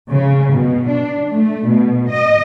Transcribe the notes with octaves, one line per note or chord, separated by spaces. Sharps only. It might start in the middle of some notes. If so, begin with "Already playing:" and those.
C#3
B2
D4
A3
B2
D#5